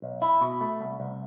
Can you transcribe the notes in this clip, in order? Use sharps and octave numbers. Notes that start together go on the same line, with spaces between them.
B1
E4
B2
A3
C2
C2